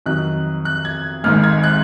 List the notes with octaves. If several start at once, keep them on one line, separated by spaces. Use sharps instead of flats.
F2 D#3 F#3 F#6
F#6
G#6
G#1 G#2 D#3 F6
G#6
F#6